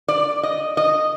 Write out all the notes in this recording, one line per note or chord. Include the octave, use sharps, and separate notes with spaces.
D5
D#5
D#5